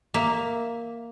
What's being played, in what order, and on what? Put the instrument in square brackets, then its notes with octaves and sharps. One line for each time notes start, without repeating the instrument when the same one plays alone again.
[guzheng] A#3 E5